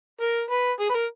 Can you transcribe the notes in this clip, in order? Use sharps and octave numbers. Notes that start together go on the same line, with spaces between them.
A#4
B4
G#4
B4
A#4